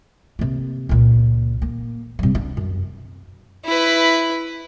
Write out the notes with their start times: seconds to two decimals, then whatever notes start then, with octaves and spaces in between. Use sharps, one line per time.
0.39 C3 A#3
0.89 C#2 A#2
1.62 A#3
2.19 C3 G3
2.35 B3 D4
2.57 F#2
3.65 E4 B4